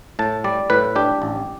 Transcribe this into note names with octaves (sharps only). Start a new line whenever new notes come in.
A2 A5
G3 D5
A2 B4
D4 G4
A1